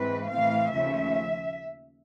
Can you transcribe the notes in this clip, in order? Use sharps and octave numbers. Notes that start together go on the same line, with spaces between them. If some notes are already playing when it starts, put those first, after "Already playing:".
Already playing: G#2 E3 G#3 C4 B4
A2 E3 A3 C4 F5
D#2 C#3 F3 A3 C#4 E5